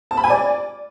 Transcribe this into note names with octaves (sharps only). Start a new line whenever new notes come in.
A5
B5
G#5
D5